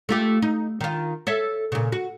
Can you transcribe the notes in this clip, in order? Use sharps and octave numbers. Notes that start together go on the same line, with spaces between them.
A3 F4 G4
D#4
D#3 F4
A4 C#5 E5
A#2 C#3
F#4